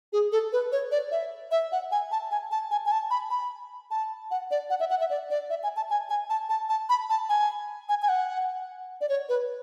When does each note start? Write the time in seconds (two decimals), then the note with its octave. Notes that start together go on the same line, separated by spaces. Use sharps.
0.13 G#4
0.32 A4
0.53 B4
0.72 C#5
0.91 D5
1.11 E5
1.51 E5
1.72 F#5
1.92 G#5
2.11 A5
2.31 G#5
2.51 A5
2.71 G#5
2.86 G#5
2.92 A5
3.11 B5
3.30 B5
3.91 A5
4.31 F#5
4.51 D5
4.70 F#5
4.80 E5
4.90 F#5
5.01 E5
5.10 D5
5.30 D5
5.50 E5
5.63 G#5
5.76 A5
5.90 G#5
6.10 G#5
6.30 A5
6.49 A5
6.69 A5
6.89 B5
7.10 A5
7.29 G#5
7.89 G#5
8.02 G#5
8.09 F#5
9.01 D5
9.09 C#5
9.29 B4